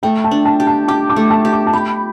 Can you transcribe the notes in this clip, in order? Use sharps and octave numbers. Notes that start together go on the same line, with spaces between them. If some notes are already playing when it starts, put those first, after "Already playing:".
A3 G5
A5
D4
A5
G4
A5
G4 D6
D6
A3
A5
G4
D6
A5
G4 B5